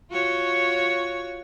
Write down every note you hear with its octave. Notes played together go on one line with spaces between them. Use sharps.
F4 F#4 C#5